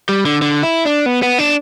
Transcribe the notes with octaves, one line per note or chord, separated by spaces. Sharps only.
G3
D3
D3
E4
D4
B3
B3
D4